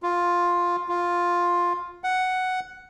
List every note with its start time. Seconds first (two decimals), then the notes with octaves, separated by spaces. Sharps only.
0.03 F4
0.88 F4
2.04 F#5